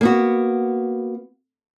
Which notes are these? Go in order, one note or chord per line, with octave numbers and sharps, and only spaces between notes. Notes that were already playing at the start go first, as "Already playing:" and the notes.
A#3 B3 F#4